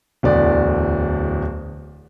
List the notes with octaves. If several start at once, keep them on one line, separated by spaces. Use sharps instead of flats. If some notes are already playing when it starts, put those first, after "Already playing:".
D1 E2 D3 D5